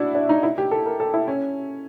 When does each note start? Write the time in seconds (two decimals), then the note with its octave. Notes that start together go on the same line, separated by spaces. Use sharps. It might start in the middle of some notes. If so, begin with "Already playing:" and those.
Already playing: D4 E4 F#4
0.15 D4
0.29 D#4
0.43 E4
0.58 G4
0.71 A4
0.86 A#4
1.00 A4
1.14 E4
1.28 C#4